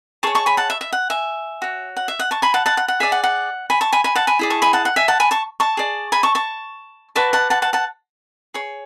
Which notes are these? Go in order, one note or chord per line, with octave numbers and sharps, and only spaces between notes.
G#4 C#5 A5 C#6
A5 C#6
G#5 B5
F#5 A5
E5
E5
F#5
E5 G#5
F#4 C#5
F#5
E5
F#5
A5 C#6
G#5 B5
F#5 A5
F#5 A5
F#5
F#5
G#4 D5 E5 G#5
F#5
F#5
G#5 B5
A5 C#6
G#5 B5
G#5 B5
F#5 A5
G#5 B5
E4 G#4 D5
A5 C#6
G#5 B5
F#5 A5
F#5
E5 G#5
F#5 A5
G#5 B5
A5 C#6
A5 C#6
G#4 D5
G#5 B5
A5 C#6
A5 C#6
F#4 B4 D5 A5 C#6
F#5 A5
F#5 A5
F#5 A5
F#5 A5
G#4 C#5